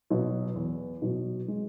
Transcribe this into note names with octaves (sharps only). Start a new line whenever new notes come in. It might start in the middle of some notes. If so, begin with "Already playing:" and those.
B2 F#3
E2
B2 F#3
G#3